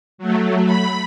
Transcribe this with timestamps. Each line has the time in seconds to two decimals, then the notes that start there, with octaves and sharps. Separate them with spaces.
0.18 F#3 A3
0.65 B5